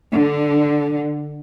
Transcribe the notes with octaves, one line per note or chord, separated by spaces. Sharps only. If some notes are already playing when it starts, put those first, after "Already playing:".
D3